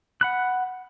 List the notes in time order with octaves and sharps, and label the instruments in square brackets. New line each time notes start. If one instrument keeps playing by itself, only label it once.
[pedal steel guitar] F#5 B5 F#6